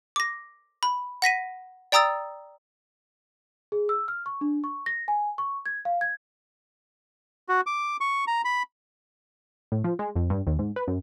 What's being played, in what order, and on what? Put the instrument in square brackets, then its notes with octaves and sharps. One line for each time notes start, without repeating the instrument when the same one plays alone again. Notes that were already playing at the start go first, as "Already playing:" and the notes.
[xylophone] D6 A#6
B5
F#5 A#6 B6 D#7
D5 G5 A#5 D#6 E6 A6
[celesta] G#4
E6
F6
C#6
D4
C#6
A#6
G#5
C#6
G#6
F5
G#6
[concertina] F#4
D6
C#6
A#5
B5
[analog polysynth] A2
F3
G#3
F2
G2
D#2
G#2
B4
F#2